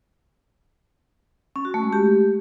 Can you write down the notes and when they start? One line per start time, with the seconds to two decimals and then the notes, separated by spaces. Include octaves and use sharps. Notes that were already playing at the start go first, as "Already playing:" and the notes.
1.56 C#4
1.65 F#4
1.74 A3
1.83 G#3
1.93 G4